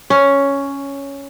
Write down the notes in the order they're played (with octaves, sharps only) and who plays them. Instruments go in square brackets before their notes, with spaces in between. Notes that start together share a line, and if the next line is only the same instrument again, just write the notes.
[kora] C#4